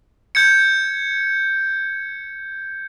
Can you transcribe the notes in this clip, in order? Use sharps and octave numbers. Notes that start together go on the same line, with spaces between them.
G6 G#6 C#7